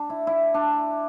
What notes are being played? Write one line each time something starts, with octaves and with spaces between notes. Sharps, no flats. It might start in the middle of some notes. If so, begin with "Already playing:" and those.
Already playing: D4
E4
E4
D4